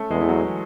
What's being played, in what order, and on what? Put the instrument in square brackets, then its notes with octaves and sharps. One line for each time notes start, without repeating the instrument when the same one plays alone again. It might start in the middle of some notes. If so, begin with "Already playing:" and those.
Already playing: [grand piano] A3 C#4
[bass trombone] E2 [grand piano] G#3
[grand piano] E3
F#3